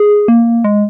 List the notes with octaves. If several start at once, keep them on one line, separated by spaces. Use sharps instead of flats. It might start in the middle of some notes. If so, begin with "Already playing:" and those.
Already playing: G#4
A#3
G#3